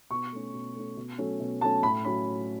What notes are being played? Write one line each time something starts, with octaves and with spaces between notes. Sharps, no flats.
B2 C#6
A3 C#4
B2
A3 C#4
B2
F#3 A3 C#4
B2
F#3 A3 C#4 A5
A2 B5
F#3 C#4 B5
A2